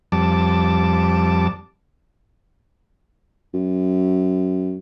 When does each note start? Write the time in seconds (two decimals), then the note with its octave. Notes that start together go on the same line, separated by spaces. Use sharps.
0.12 F2 G3 A5 D6
3.54 F#2